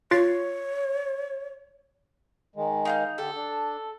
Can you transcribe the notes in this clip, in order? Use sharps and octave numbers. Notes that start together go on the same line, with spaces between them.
F4 C#5 A6 C7
D#3 G#3
D#4 F5 G6
D3 G4 A4
D4